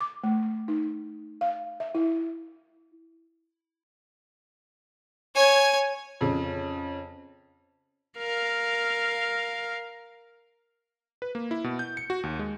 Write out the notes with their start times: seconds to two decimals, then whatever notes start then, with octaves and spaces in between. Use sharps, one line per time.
0.01 D6
0.24 A3
0.68 D#4
1.41 F5
1.80 E5
1.95 E4
5.35 C#5 G#5
6.21 F2 C#3
8.18 A#4 F5
11.22 B4
11.35 A#3
11.51 E4
11.64 B2
11.79 G6
11.97 C#7
12.10 F#4
12.23 D#2
12.39 G#3